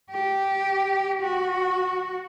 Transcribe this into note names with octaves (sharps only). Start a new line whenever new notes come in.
G4
F#4